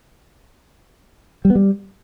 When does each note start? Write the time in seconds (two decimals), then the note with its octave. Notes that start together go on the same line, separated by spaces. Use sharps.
1.45 G3
1.50 B3
1.55 G3